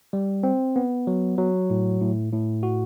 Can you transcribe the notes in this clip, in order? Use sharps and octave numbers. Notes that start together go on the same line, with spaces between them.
G3
C4
B3
F#3
F#3
A2
A2
A2
F#4